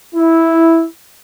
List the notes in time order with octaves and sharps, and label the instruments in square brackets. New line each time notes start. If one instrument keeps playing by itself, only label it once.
[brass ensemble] E4